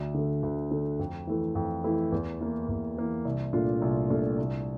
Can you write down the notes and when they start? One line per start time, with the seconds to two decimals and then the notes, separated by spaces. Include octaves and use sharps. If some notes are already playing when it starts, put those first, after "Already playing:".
Already playing: D2
0.14 D3 A3
0.43 D2
0.71 D3 A3
0.99 F2
1.27 E3 A3 E4
1.55 F2
1.84 E3 A3 E4
2.12 E2
2.41 E3 A#3
2.69 E2
2.97 E3 A#3
3.25 C2
3.53 A#2 A3 D4 F4
3.82 C2
4.10 A#2 A3 D4 F4
4.38 C2